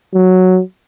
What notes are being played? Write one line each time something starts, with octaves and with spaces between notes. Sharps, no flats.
F#3